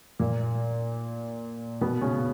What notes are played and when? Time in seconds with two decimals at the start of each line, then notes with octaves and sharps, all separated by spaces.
0.19 A#2 A#3
1.81 B2 B3
2.01 C#3 C#4